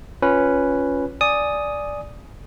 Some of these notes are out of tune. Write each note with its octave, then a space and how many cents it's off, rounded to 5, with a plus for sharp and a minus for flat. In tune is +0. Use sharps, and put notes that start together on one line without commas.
C#4 +0 F4 +0 B4 +0
D5 +0 G#5 +5 D#6 +5